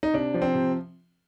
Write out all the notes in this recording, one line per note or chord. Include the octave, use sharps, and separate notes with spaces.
D#4
C3 D4
F3
C4
C3